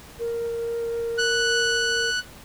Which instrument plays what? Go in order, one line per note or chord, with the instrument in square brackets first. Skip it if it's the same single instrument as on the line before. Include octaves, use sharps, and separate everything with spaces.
[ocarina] A#4
[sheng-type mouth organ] F#6